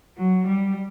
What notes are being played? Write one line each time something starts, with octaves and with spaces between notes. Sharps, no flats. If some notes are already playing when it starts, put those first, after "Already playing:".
F#3
G3